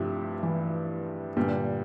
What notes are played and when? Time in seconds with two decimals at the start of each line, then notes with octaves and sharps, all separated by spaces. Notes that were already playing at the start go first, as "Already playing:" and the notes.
Already playing: G2 C3 F3 A3 E4 G4
0.43 E3
1.37 G2 A#2 D3 G3